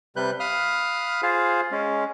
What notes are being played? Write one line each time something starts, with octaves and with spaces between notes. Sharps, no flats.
C3 G3 B4 F#6 G6
F5 B5 D#6 F6 F#6
F4 G#4 C5 F5
G#3 C#4